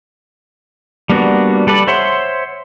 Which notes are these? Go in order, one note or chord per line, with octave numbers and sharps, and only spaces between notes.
G3 A#3 B3 D4 F#4
G3 A4 B4 D5
C5 C#5 E5 F#5 C6